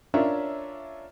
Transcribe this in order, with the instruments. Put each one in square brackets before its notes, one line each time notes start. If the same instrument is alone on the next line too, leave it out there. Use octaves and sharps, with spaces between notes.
[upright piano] C#4 D4 F4 A#4 C#5 E5